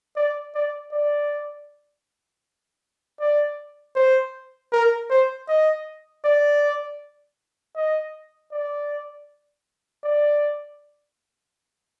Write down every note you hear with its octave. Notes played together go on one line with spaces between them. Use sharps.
D5
D5
D5
D5
C5
A#4
C5
D#5
D5
D#5
D5
D5